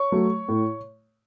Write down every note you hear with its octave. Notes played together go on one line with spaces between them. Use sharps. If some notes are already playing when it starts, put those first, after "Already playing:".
Already playing: C#5 C#6
F#3 A3
A2